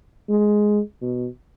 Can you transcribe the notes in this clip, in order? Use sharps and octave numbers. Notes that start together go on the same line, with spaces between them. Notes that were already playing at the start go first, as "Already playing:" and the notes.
G#3
B2